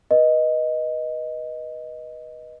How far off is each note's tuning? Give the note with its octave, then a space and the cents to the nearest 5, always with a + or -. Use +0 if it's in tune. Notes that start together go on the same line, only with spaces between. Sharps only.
B4 -20 D#5 +0